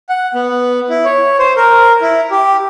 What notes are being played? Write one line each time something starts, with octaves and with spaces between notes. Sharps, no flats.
F#5
B3
E4
C#5
C5
A#4
E4
G4